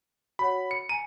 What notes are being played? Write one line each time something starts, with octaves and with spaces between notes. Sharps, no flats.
F#4 C#5 F#5 B5
C#7
G#5 A#5 D#7